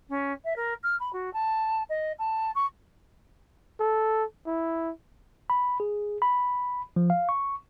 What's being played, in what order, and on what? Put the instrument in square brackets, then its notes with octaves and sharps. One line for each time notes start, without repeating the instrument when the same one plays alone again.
[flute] C#4
E5
A#4
F6
B5
F#4
A5
D#5
A5
C#6
[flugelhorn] A4
E4
[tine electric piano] B5
G#4
B5
F3
F5
C#6